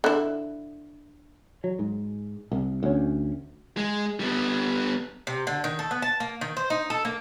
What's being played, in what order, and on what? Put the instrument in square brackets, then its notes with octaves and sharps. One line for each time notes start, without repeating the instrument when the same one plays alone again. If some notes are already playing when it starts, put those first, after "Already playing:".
[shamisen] D3 E4
[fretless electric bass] F#3
G#2
C2
D2 C#4
[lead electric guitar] G#3
G3 B3
[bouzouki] C3
D3
D#3
A4
B3
A5
A#3
D#3
C5
D#4
A4
A#3